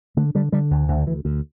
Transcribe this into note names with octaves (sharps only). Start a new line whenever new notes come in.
D3 A3
D3 G3
D3 G3
D2
D2 D3
D2 E3
D2